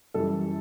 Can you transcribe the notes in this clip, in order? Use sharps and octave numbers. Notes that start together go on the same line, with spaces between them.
F#2 E3 G3 A4